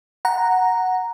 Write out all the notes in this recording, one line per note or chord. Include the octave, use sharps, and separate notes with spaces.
F#5 A#5